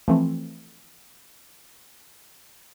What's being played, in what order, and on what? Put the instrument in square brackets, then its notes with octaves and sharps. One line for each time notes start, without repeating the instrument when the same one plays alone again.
[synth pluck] E3 F3 A3 C4